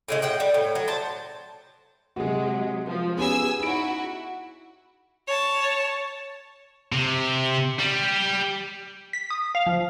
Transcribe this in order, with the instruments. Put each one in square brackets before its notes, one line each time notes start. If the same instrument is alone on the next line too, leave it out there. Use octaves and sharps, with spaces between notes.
[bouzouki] A2 C#3 G#3
A2 F#5 G5
G3
A2
F#3
C5 A5
[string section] C3 F#3 G#3 [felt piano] F#4 G#4
[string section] F3
[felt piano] B3 C#4 G4 [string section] G#4 G#5 E6
[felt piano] D#4 D7 [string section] E4 F#4
[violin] C#5 A5
[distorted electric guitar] C3
G3
[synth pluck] B6
D#6
F5
F3